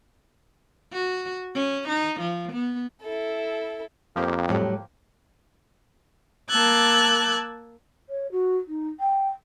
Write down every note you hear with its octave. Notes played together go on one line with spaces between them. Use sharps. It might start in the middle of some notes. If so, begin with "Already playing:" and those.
F#4
C#4
D#4
F3
B3
E4 A4
F2 F3 A#3 G4
A2 F#3 G3
A#3 A5 D6 E6 F#6 G#6
C#5
F#4
D#4
G5